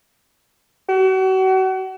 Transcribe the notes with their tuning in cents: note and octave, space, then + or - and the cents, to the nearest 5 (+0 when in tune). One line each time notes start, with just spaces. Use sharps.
F#4 +35